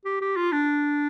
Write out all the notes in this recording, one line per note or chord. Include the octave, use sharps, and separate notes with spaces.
G4
G4
F4
D4